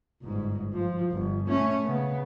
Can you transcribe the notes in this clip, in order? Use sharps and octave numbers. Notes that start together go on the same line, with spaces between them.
G1 G#2
F3
G1
A3 C#4
C#3 B3